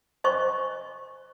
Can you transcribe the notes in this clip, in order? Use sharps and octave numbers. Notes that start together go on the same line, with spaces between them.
C5 D#5 G#5 C#6